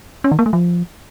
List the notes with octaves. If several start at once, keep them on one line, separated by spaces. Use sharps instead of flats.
C#4
D#3
A#3
A3
F3